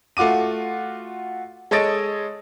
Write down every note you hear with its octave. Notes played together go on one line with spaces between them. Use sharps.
A3 F4 F#4 D6 D#7
G#3 A4 C#5 D#5 A6 D7